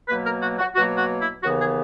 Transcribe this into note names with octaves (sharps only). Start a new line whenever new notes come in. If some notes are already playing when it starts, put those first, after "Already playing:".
B2 F#3 A#3 B4
A#4
F#4
F#4
B2 F#3 A#3 F#4
F#4
E4
D#2 C#3 E3 B3 F#4
G#4